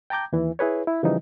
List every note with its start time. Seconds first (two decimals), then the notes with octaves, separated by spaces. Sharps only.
0.10 G5 A5 A#5 D6 G6
0.33 D#2 E3
0.59 E4 G#4 B4 C#5
0.87 E4
1.03 C#3 E3 F3 G3 D#4